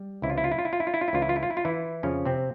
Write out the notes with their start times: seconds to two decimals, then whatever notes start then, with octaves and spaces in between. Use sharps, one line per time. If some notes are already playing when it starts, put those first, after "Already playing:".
Already playing: G3
0.22 C#2 C3 E3 E4
0.30 F4
0.38 E4
0.44 F4
0.52 E4
0.59 F4
0.65 E4
0.73 F4
0.80 E4
0.87 F4
0.94 E4
1.01 F4
1.08 E4
1.13 C#2 C#3 E3 F4
1.22 E4
1.29 F4
1.36 E4
1.43 F4
1.51 E4
1.57 F4
1.65 E3 E4
2.03 F2 C#3 F3 C#4
2.25 C3 C4